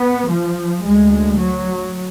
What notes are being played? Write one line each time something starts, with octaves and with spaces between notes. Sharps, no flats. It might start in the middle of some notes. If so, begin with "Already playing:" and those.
Already playing: B3
F3
D2 G#3
F#3